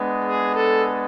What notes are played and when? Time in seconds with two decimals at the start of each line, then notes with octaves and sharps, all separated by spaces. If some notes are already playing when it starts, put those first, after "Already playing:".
Already playing: G#3 B3 D4
0.25 G#4
0.55 A4